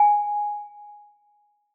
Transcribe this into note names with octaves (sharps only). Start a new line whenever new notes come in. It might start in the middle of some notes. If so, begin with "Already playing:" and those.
Already playing: G#5